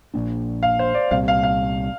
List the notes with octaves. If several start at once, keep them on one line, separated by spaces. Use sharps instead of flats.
A#1 A#2 A#3 D4
F5
C5
D5
C2 A#2 G3 C4 F5
F5
F5